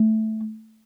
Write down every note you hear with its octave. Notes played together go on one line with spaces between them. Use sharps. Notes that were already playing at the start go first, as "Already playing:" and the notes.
Already playing: A3